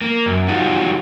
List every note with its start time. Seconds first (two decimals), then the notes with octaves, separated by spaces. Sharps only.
0.01 A#3
0.26 F#2
0.48 F#3 G3 D#4 F4 F#4